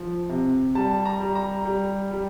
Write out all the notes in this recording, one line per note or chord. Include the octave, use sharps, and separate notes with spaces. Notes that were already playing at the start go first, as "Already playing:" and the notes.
Already playing: F3
C3
G3 A5
A#5
G3
A#5
G3
G3